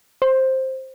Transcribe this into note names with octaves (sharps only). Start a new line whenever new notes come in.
C5